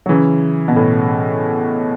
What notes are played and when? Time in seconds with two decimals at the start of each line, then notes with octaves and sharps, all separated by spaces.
0.06 F#3
0.09 C#3 E3
0.68 B2
0.76 A2